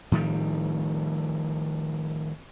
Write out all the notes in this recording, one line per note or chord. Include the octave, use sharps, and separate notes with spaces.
A2 D#3 F3 G3